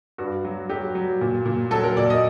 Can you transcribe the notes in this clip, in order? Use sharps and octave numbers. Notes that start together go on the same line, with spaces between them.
G2 F#4
F#3
F#3 G4
F#3
A#2
A#2
F#3 A4
A#4
A#2 D5
D#5